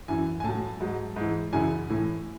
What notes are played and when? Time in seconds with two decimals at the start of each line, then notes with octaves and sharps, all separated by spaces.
0.08 F#2 E3 G#5
0.40 G#5
0.44 A2 F#3 A5
0.80 G#2 F#3
1.16 G#2 E3
1.53 F#2 C#3 E3 G#5
1.90 A2 E3